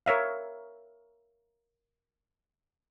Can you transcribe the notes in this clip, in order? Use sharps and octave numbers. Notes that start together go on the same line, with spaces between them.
A#4 C#5 E5 F5